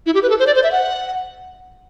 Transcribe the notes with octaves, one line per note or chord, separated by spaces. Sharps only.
E4
G4
B4
A4
C5
D5
C5
E5
F#5